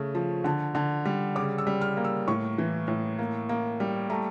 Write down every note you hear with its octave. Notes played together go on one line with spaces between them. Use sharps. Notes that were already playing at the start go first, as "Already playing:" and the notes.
Already playing: C#3 A3
F3
D3 A5
D3 A5
G3
C#3 D6
E6
G3
F6
A#3
E6
A2 C#6
E3
A2
A#3
A#3
G3
A3 A#5